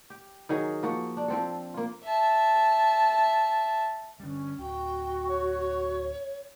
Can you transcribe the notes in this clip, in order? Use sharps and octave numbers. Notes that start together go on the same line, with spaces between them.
G4
D#3 F#3 G#4
F3 A#3 F#4
D4
F3 C4 A4
A#3 F4
E5 A5
D3 G3 C#4
D1 F#4 G5
C#5